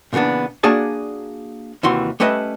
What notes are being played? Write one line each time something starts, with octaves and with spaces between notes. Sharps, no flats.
A#2 C#3 E3 B3 D4
A#3 D4 F#4 G#4 D5 A5
D#2 C3 E3 F#4 C6
G3 A3 C#4 B4 D#5 E5